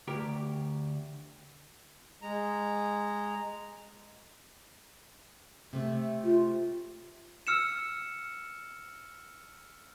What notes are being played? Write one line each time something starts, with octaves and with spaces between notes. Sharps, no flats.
D2 G4 A#4
G#3 A#5
C3 A3
F4
E6 F6 C#7 E7